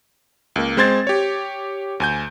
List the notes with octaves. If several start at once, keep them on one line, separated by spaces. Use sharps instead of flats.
C#2 A#3
G#3 C4 C5 C6 G#6 A6
G4 C#5
D2 G#5 G6